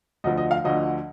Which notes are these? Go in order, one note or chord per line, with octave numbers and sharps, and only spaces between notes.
D2 D3 F3 D#5
D#5
F5
D2 D3 F3 D#5